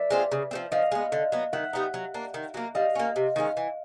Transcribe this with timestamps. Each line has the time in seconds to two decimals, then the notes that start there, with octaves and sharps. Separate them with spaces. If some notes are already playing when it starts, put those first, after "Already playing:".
Already playing: B4 D5 E5
0.11 G#3 C4 F4
0.32 C#3
0.51 F3 A3 C4
0.72 F3 D#5 F5
0.92 G#3 B3
1.12 D3
1.32 F#3 B3
1.53 D#3 E5 F#5
1.73 G3 B3 D#4
1.94 F#3
2.14 A#3 D4
2.34 D#3
2.54 F#3 A#3
2.75 G3 D#5 F5
2.95 A#3 C#4
3.16 C3
3.36 D#3 G#3 C#4
3.57 E3